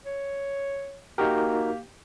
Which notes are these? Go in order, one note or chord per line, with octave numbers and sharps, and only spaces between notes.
C#5
A#3 D#4 F#4 G4 A#4